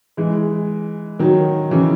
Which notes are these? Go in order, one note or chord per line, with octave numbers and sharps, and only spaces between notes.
E3 G#3
D#3 F#3
C#3 E3